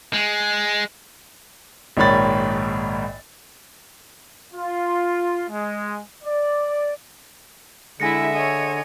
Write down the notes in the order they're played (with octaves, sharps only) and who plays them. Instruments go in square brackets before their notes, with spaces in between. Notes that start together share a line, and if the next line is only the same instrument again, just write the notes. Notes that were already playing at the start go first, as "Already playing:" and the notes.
[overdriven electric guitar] G#3
[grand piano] A#1 G#2 D#3 C#5 B5 A6
[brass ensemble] F4
G#3
D5
[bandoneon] D3 [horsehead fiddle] G#3 E4 [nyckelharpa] G#4 E5 [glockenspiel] G#5 A#6 C#7
[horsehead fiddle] C#5 D#5 [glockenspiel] G#5